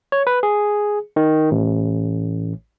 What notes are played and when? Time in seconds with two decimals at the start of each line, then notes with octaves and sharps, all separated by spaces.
0.12 C#5
0.27 B4
0.43 G#4
1.16 D#3
1.51 A1